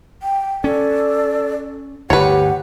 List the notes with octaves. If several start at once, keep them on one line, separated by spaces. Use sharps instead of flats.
G5
C#4 A4 D5
G1 D2 G4 B4 C#5 F#5